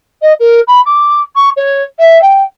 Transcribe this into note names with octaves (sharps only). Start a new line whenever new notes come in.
D#5
A#4
B5
D6
C#6
C#5
E5
G5